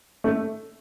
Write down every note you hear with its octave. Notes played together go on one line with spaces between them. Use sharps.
A3